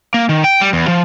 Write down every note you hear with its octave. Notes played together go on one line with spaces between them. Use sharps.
A#3
D#3
G5
G3
E2
F3